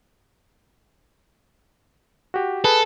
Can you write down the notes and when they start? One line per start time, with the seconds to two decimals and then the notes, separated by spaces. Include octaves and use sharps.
2.34 F#4 G4
2.64 G#4 A4 B4